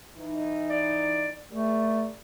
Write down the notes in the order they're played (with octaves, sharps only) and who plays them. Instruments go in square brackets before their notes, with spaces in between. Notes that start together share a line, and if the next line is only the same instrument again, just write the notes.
[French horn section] E3 D#4
[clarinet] D5
[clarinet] A3 [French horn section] G#4 A#4 D5